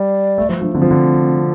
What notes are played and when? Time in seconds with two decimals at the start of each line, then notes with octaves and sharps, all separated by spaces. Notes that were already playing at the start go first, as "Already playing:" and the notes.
Already playing: G3 D5
0.38 A3
0.49 F3 F4
0.62 F3 D4
0.74 D3 C4
0.82 F3
0.91 D3